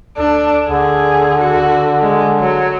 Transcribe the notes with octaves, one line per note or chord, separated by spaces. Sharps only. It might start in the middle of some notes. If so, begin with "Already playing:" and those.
D2 D4 A4
D2 D3 G#4
F#4
D1 G#3
F#1 F#3